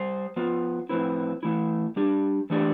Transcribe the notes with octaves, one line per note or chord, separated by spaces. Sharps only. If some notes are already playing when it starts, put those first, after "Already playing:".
Already playing: G3 C5
F3 B3 F4 B4
A2 F3 C4 E4 B4
E3 A3 E4
G3 D4 G4
E3 A3 D4 G4 D5